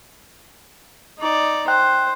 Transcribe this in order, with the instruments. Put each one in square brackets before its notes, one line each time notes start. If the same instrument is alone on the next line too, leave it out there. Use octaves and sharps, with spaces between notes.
[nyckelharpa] D#4 D5
[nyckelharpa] C5 [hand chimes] G5 F#6